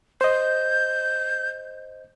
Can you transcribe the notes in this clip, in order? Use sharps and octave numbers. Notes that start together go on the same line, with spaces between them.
C5 D#5 G6